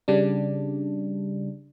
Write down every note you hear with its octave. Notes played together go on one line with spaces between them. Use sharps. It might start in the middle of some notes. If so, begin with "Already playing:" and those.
C#3 G3 D4